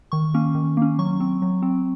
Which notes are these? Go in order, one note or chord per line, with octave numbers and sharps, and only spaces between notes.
D#3 C#6
A#3 C#4
D#3
A#3 C#4
F#3 C#6
C4
F#3
C4